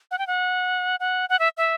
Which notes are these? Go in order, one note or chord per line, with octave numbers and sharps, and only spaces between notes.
F#5
G5
F#5
F#5
F#5
E5
E5